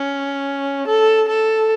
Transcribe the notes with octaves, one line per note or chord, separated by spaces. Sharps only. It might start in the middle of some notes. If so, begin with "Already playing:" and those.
Already playing: C#4
A4
A4